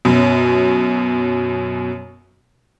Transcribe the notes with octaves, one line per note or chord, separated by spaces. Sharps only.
F#2 B2 F#3